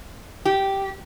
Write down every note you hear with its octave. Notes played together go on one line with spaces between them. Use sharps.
G4